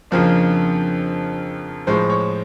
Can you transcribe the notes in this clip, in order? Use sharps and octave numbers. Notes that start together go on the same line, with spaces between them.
F2 C#3 F3 A#3 D4
A2 F3 G#3 C5
C#5